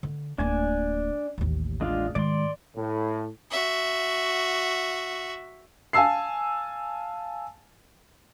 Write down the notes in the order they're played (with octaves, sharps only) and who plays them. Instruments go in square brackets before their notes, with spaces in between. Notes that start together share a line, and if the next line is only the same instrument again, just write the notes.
[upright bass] D3
[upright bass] D1 A#3 [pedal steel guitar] D4 G#5
[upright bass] A1 D#2
[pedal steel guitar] G#3 D4 F4
[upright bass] G#2 D#3 [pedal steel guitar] D5 C6
[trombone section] A2
[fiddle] F#4 E5
[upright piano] F5 G#5 A5 E6 C7